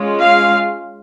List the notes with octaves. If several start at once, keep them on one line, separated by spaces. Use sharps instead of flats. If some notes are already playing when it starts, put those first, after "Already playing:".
Already playing: G#3 C#4 F4
F5